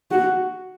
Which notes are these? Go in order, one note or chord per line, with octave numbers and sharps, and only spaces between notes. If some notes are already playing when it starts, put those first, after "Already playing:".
F#4